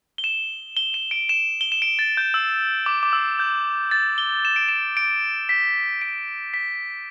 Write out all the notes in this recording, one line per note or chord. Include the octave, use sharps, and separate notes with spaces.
G7
E7
G7
E7
D7
E7
G7
E7
D7
A6
G6
E6
D6
D6
E6
G6
A6
G7
E7
D7
E7
D7
B6
D7
B6